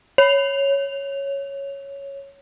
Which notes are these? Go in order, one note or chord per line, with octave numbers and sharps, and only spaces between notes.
C#5 F7